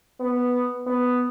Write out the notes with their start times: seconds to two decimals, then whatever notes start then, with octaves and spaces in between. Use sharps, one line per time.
0.21 B3
0.87 B3